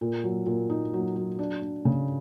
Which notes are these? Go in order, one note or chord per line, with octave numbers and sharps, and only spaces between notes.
A#2
F#3
A#2
D#4
F#3
F#3
D4
D4
C#3